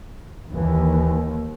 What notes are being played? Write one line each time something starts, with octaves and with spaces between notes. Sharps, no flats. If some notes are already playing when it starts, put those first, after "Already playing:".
D#2 E3